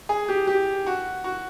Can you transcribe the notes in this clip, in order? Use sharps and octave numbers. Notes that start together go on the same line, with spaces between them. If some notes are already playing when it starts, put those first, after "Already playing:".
G#4
G4
G4
F#4
F#4